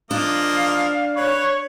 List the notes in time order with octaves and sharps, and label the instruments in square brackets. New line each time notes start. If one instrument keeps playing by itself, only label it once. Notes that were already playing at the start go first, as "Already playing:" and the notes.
[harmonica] F3 A#3 D#5 [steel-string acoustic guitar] D4 [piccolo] F5
[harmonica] B4 [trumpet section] C#5